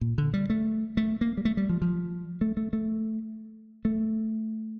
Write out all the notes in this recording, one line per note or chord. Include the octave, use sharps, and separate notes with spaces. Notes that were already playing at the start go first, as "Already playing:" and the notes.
A#2
D3
G3
A3
A3
A#3
G3
A3
G3
F3
F3
A3
A3
A3
A3